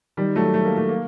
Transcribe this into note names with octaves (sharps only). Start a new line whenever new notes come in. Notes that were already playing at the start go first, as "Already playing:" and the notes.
D#3 G3
F#3 A3
A3
A#3
A3
A#3